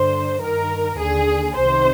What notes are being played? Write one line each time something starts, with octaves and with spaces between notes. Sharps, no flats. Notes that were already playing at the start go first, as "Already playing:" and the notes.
Already playing: G2 D3 C5
G2 D#3 A#4
D#2 D3 G#4
C2 C3 D#3 C5